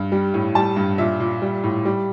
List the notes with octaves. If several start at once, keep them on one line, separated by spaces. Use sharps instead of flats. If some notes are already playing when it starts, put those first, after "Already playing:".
Already playing: G2
G3
A2
G3 A5
G2
A#2 E5
A#2
G3
A2
G3